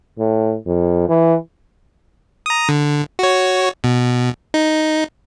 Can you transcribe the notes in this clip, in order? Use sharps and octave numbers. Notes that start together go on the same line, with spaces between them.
A2
F2
E3
A#5 D#6
D3
F#4 C#5
B2
D#4